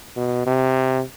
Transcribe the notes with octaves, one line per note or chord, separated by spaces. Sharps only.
B2
C3